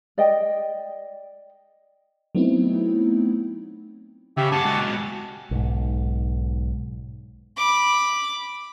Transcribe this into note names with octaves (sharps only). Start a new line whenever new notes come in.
D5 D#5 G5
F#3 A3 B3 C4 D#4 E4
C#3 G4 E5
G#4 F#5 A5 D6
G#3 F#4
B1 G#2
B5 D6